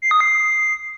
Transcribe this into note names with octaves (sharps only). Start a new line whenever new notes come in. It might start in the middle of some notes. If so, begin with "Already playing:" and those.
C7
D#6
C7